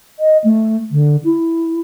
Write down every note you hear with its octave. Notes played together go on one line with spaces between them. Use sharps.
D#5
A3
D3
E4